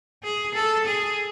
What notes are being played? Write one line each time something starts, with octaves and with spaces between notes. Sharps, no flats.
G#4
A4
G#4